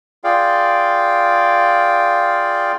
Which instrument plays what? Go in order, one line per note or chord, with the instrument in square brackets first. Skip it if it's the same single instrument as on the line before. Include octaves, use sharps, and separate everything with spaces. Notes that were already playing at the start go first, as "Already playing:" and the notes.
[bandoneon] F4 G#4 D5 F5 G5